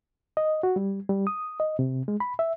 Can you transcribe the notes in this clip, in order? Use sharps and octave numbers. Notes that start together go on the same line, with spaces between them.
D#5
F#4
G3
G3
D#6
D#5
C3
G#3
B5
E5